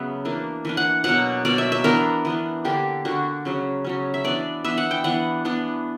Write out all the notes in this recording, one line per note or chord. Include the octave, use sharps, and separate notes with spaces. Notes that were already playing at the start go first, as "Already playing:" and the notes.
Already playing: C#3 F#3 B3 E5
E3 A#3 D4
E3 A#3 D4
F#5
B2 F#3 A#3 F#5
B2 F#3 A#3 D5
E5
E5
E3 B3 D4 A#4
E3 B3 D4
D3 A#3 D4 G4
D3 A#3 D4 F#4
C#3 F#3 C#4
C#3 F#3 C#4
E5
E3 B3 D4 D5
E3 B3 D4 E5
F#5
G5
E3 B3 D4 F#5
E3 B3 D4